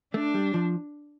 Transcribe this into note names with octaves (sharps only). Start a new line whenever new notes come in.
A3 D4
G3
F3